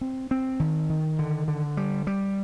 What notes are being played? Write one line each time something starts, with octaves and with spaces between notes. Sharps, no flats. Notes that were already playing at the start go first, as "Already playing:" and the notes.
C4
C4
D#3
D#3
D3
D3
G3
G3